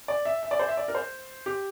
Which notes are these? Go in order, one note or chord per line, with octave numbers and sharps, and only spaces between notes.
D5
E5
E5
D5
C5
E5
D5
A#4
C5
G4